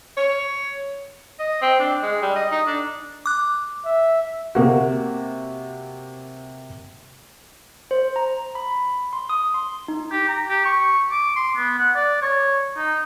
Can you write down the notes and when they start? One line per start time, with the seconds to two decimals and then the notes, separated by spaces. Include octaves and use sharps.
0.18 C#5
1.39 D#5
1.62 C4
1.79 D4
2.02 G#3
2.22 G3
2.36 D#5
2.51 D#4
2.67 D4
3.26 D6 F#6
3.85 E5
4.55 C3 A#3 F#4
7.91 C5
8.16 A#5
8.55 B5
9.13 C6
9.29 D#6
9.54 C6
9.88 D#4
10.12 G4
10.29 A#5
10.49 G4
10.65 C#6
11.12 D6
11.36 C6
11.57 B3
11.78 F#5
11.96 D5
12.22 C#5
12.77 D#4